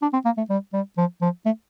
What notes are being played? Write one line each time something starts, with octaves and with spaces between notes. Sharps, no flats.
D4
C4
A#3
A3
G3
G3
F3
F3
A3